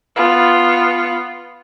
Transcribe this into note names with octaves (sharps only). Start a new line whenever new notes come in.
B3 F4